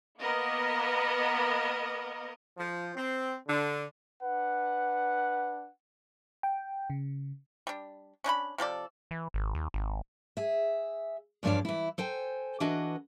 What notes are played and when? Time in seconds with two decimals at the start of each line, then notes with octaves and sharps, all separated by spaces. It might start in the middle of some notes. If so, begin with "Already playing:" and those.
0.21 A#3 B3 A#4 D#5
2.58 F3
2.96 C4
3.47 D3
4.22 D4 B4 F#5
6.43 G5
6.90 C#3
7.67 G3 D4
8.24 C#4 D4 C5 B5
8.58 C3 F3 A4 D5
9.11 E3
9.34 G#1
9.55 D#2
9.74 G#1
10.37 G#4 E5
11.43 E2 G2 F3 D4 C#5 D5
11.65 E3 E4
11.98 A4 C5 G5 G#5
12.60 E3 D4 F#4 B4 D#5